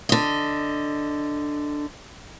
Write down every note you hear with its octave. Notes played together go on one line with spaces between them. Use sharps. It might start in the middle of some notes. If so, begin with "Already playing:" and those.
D3 D#5